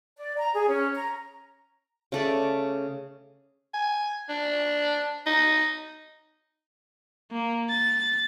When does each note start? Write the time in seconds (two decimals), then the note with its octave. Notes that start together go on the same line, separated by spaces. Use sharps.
0.17 D5
0.38 A#5
0.53 G#4
0.68 C#4
0.95 A#5
2.12 C#3 A3 D5
3.74 G#5
4.29 D4
5.26 D#4
7.32 A#3
7.69 A6